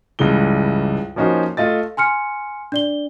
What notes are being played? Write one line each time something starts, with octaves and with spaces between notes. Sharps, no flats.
C#2 G2 C#3 E3 G7
F3 A#3 C#4 D#4 F#4 C5
A3 F4 D#5 A6
G#5 C6 F6 C#7
D4 D5 G7